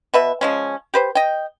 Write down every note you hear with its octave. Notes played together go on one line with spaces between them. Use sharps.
B2 B4 E5
F3 G#3 C#4
G4 B4 C5
D#5 G5